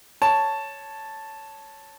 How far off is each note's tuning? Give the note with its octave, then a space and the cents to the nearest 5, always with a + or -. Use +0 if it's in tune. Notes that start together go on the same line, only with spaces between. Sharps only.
C#5 +0 A5 +0